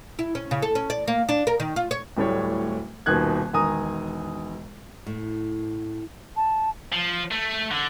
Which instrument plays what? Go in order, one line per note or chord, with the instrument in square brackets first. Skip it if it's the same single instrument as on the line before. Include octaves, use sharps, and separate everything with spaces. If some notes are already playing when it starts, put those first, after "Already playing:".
[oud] E4
C#4
C#3
A4
C#4
D5
A#3
D4
A#4
D#3
F4
C#5
[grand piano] D1 A2 G3 C#5
D#1 B2 D#3 F#6 G#6
E1 D#3 G#5 A#5 D#6
[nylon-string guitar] A2
[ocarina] A5
[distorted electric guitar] F3
A3
D3